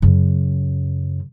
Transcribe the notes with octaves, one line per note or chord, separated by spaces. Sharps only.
F#2 C#3